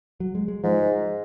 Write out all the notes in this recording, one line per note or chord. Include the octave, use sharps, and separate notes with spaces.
F#3
G#3
G#3
G#2 F3